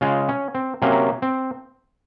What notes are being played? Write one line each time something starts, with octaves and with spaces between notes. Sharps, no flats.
C#3 G#3 F4
C#4
C4
C3 F#3 A#3 C#4
C4